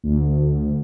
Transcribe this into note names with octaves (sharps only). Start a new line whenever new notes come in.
D2